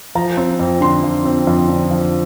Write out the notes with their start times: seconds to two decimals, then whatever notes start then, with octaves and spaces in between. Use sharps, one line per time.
0.15 F3 A#5
0.37 C4
0.59 F2
0.81 D3 C6
1.03 F3
1.25 C4
1.47 F2
1.68 D3
1.91 F3